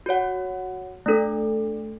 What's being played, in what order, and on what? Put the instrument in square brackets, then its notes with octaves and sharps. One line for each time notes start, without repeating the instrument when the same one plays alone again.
[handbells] F#4 C#5 F#5
A3 D4 A4